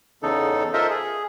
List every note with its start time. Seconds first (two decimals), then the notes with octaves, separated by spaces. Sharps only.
0.23 E2 C#3 D#4 A4
0.73 F4 A4 A#4 C5 D#5 E5
0.90 G#4